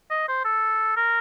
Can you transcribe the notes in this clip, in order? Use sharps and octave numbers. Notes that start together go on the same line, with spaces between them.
D#5
C5
A4
A#4